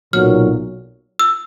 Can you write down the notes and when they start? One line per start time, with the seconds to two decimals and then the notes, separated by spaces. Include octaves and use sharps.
0.13 B1 A#2 F#3 F6
1.19 E6